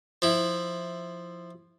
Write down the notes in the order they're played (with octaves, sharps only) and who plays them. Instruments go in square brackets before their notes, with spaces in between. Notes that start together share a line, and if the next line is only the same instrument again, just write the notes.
[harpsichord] F3 E4